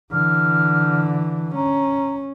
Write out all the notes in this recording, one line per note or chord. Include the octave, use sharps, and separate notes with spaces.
D3 E3 F6
C#4 A#5